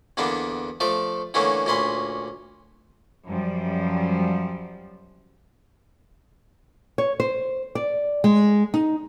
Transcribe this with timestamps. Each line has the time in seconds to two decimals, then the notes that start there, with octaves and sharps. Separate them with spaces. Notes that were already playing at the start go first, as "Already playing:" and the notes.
0.17 E2 D3 A#3 B3 D4
0.80 F3 A3 D5
1.34 D3 E3 A3 A#3 C#4
1.66 D2 A#2 C#4 B5 C6
3.27 F#2 F3 G3
6.98 C#5
7.20 C5
7.75 D5
8.24 G#3
8.74 D#4